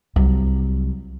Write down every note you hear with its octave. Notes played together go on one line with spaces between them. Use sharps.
C2 F#3